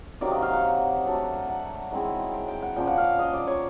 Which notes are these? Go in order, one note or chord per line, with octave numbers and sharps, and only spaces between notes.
C3 D#3 F#3 A#3 D5
D#5
F5
F#5
F#3 A3 D4
F#5
D#3 G#3 C4 E4 F#5
G5
G5
F#5
A#2 F3 A#3 C#4 G5
F#5
F5
D#5
D5
C#5